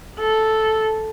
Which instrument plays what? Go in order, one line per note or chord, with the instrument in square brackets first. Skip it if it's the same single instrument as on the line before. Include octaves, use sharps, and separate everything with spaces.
[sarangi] A4